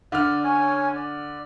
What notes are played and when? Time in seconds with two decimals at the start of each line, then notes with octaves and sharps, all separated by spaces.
0.12 D3 D5 F6
0.44 C#4 C#5 G#5
0.95 D5